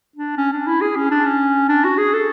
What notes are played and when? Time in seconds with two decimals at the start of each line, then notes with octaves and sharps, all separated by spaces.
0.16 D4
0.37 C#4
0.52 D4
0.67 E4
0.81 G#4
0.96 C#4
1.11 D4
1.26 C#4
1.69 D4
1.84 F#4
1.98 G#4
2.13 A4